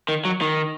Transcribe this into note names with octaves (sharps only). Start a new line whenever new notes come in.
D#3
F#3
D#3